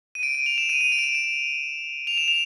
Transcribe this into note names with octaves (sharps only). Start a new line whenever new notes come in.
D#7
D7
D#7
F7
E7
D#7
D#7
D7
E7
D#7
E7
F7
E7
F7